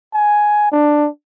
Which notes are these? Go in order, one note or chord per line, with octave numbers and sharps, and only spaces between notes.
G#5
D4